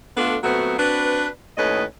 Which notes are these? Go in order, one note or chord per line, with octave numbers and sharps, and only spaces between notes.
A3 B3 D4 F4 A4
A#2 F#3 A3 B3 C4 F#4
C4 D4 F#4 B4
D#2 A2 C#4 B4 D#5